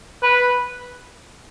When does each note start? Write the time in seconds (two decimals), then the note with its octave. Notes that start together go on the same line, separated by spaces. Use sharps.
0.23 B4